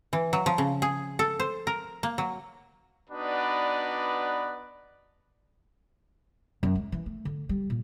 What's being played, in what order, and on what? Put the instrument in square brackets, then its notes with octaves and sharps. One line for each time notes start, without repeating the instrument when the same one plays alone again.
[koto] E3
F#3
F3
C#3
G#4
A4
C5
A#4
A#3
F#3
[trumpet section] B3 D4 D#4 F#4 B4 D5
[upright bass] F#2
G#3
E3
A3
D3
G3
A#2